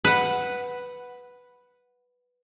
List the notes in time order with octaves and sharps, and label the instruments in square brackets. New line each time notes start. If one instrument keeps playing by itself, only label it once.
[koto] B4 F#5